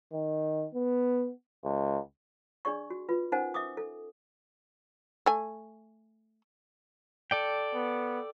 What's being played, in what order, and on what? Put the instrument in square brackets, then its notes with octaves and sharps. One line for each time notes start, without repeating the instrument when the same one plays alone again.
[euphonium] D#3
B3
C#2
[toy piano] D4 G#4 D5 C#6
F#4
F4 B4
C#4 D#4 A#4 C5 F#5 G#5
E5 D6 D#6
A4
[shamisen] A3 G#5
[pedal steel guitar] A4 D5 G5
[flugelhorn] B3